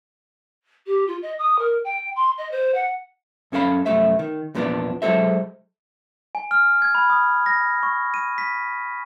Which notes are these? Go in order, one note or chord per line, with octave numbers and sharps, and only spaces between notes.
G4
F4
D#5
D#6
A#4
G5
C6
D#5
C5
F#5
F#2 C#4 A4 F5 B5
C2 F#2 A3 E5
D#3
E2 A#2 F3 B3 C4 D4
F#3 G#3 A4 C5 E5
G#5
F6
G#6
B5
D#6
A#6
C#6
D#7
B6